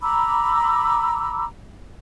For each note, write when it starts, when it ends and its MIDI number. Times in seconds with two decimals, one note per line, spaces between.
0.03 1.44 82
0.03 1.44 83
0.03 1.44 86
0.03 1.44 88